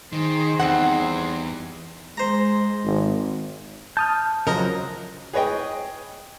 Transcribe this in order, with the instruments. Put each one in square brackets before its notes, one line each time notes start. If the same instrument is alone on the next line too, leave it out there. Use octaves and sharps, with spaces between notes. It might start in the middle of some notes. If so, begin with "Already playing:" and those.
[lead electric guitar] D#3 [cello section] D#4 G#4 C5
[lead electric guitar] E2 [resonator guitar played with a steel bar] G3 C4 F#5
[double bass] G#3 [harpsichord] C5 A#5
[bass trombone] G#1
[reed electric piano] A5 D#6 F6 [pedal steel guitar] G6
[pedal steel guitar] C#3 F3 F#3 [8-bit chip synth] A#4 D#5 A#5
[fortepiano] G#4 B4 C#5 D#5 G5